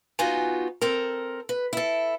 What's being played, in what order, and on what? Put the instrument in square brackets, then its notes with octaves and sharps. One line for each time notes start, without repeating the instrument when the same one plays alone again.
[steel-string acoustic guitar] B3 D#4 F4 F#4 G#5
C4 A4 A#4
B4
E4 A4